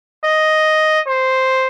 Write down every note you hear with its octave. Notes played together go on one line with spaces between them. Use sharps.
D#5
C5